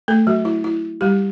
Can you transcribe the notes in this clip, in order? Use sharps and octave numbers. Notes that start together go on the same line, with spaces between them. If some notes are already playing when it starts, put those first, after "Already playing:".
A3 A4
F#3 F#4
E4
E4
G3 G4